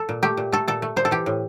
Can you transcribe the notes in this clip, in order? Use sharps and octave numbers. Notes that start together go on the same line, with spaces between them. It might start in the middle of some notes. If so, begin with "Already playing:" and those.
Already playing: A4
A#2
A3 G4
A#2
A3 A4
A#2 A4
A3
A#2 C5
A4
E3 G4
A2